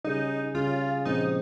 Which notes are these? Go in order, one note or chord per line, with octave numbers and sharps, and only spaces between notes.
C#3 G3 C#4 D#4 G#4
C#3 G3 C#4 F4 G#4
A#2 F3 G#3 C4 D#4